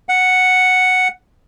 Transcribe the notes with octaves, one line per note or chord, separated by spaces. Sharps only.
F#5